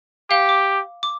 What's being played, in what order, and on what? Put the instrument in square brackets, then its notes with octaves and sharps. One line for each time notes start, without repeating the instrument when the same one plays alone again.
[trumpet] G4 [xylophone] F5
[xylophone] D6
D6